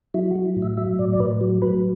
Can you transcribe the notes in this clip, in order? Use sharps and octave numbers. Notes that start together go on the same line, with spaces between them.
F#3 E4
F#4
F#3
E4
A2
E5
F#3 E5
A2 D5
D5
A2 B4
F#3
F#3 B4